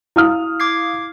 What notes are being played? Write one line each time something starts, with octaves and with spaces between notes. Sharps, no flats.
E4 F5 D#6 F6
D6 G#6 C7